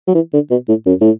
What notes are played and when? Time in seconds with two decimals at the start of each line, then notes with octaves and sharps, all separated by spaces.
0.07 F#3
0.14 E3
0.33 D3
0.51 B2
0.68 A2
0.86 F#2
1.01 A2